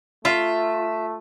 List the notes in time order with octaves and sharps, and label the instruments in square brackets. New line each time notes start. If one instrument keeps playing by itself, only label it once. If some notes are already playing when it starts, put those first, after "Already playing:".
[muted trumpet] A3 [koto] F4 [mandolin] E5